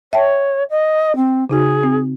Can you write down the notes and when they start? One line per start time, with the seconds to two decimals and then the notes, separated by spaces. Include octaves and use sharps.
0.13 C#5 E5 G5 A5
0.70 D#5
1.16 C4
1.49 C#3 D#4 F#4 G#4
1.83 C4